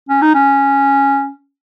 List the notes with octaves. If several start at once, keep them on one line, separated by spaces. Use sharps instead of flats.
C#4
D#4
C#4